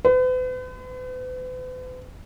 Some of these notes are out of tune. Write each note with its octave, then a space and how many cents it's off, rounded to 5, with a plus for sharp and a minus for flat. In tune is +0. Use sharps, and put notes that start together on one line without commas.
B4 +45